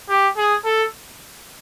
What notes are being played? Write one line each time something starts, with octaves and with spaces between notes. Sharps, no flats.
G4
G#4
A4